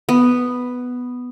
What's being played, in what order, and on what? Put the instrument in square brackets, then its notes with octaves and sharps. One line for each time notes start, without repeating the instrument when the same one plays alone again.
[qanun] B3